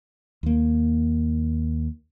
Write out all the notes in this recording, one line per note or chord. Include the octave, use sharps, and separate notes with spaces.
D#2 A#3